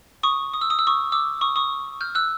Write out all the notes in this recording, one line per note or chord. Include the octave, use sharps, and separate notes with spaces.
C#6 D#6
D#6
E6
D#6
E6
C#6 D#6
D6 E6
C#6 D#6
C#6 D#6
F6 G6
E6 F#6